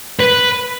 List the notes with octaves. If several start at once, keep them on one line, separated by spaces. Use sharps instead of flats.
B4